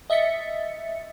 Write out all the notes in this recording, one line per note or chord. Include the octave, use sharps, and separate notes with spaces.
D#5 E5 A6 B6 C#7